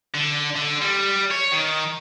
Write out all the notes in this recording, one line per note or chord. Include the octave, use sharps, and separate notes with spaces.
D3
D3
G3
C#5
D#3